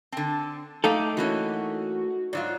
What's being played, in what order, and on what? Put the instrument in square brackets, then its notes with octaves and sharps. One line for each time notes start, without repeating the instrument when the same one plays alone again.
[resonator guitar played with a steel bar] D3 C4 [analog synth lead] A5
[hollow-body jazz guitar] A3 D#4 A4 [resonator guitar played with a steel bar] F5 G5 [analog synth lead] D6
[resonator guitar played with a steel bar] E3 A#3 C#4 [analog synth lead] F#4
[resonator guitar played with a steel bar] G#2 F#3 F4 [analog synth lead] D5